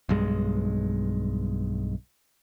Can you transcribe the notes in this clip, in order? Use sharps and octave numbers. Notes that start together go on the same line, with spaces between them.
B1 G2 G#3